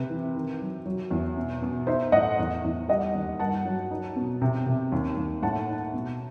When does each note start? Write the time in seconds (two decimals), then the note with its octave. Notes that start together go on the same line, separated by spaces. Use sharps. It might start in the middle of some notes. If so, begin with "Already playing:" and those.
Already playing: C3 B4
0.10 E3
0.35 D#3
0.61 F#3
0.86 F#3
1.11 E2
1.37 B2
1.62 B2
1.87 D#4 C5 E5
2.12 A2 D#5 F#5
2.39 E2
2.64 E2
2.88 G3 D#5 F#5
3.15 D#2
3.39 G2 F#5 A5
3.65 F#3
3.91 D#4
4.16 B2
4.42 C3
4.66 C3
4.92 D#2
5.17 D#2
5.42 A2 F#5 A5
5.69 D#4
5.94 B2